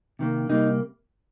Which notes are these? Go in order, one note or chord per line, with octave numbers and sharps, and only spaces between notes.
C3 D#3 G3 A#3
C3 G3 A#3 D#4